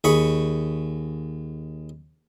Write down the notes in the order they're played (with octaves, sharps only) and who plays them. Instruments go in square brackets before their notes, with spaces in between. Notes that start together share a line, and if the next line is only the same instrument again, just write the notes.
[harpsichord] D#2 G#4 B5 C#6